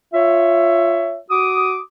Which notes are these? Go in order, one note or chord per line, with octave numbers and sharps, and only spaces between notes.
F4 C#5 E5
F#4 D6 D#6